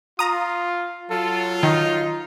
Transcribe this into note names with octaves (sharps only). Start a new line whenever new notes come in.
F4 A#5 D#6
F#3 F4 A4
D#3 D#4